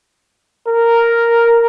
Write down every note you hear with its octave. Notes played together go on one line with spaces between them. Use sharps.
A#4